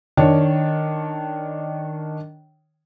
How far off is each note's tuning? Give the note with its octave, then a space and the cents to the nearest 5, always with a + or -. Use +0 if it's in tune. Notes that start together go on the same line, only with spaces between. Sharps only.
D#3 -5 D4 +0 C#5 +0